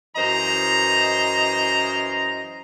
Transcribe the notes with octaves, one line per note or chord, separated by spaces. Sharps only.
F#2 E3 C5 D#5 A#5